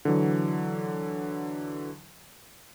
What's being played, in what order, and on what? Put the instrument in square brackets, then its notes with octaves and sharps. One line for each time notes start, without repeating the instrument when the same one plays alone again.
[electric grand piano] D3 E3 F#3